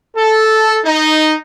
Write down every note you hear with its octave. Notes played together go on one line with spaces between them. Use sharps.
A4
D#4